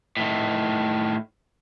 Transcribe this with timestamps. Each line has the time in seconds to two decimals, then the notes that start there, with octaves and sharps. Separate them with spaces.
0.17 A2 D#3